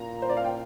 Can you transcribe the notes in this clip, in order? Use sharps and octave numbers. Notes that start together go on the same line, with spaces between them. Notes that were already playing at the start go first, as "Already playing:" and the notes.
Already playing: A#2 A#5
C5
D5
F5
G5